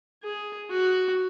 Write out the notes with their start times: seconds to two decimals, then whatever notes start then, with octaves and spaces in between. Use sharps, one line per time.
0.23 G#4
0.70 F#4